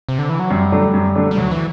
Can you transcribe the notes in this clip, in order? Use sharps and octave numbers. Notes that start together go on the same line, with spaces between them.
C3
D3
E3
F#3
F#2 G3
D3 F#3 A3 D4
F#2
D3 F#3 A3 D4
G3
D2 F#3
E3